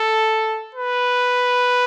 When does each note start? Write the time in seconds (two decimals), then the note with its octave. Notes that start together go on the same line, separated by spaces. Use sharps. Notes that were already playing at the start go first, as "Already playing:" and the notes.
Already playing: A4
0.75 B4